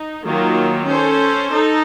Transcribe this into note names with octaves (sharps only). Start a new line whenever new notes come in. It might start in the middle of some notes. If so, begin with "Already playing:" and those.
Already playing: D#4
D#3 F#3 A#3 F4
C#4 A4 C5
D#4 A4